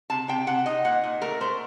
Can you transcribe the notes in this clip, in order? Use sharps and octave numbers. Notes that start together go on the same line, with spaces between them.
C3 A5
C3 G5
C3 F#5
D#4 D#5
A#2 F#5
A#2
A3 A#4
A3 C5